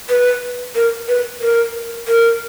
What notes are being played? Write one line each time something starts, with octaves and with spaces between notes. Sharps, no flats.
B4
A#4
B4
A#4
A#4